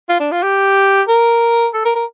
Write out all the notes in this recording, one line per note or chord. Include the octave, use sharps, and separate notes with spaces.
F4
D4
F4
G4
A#4
A4
A#4
A#4